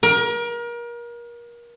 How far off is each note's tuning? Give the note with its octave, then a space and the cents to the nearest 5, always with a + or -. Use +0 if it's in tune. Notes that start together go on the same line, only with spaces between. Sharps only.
A#4 +30